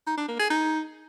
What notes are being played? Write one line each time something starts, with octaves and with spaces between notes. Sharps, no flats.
D#4
D4
A#3
G#4
D#4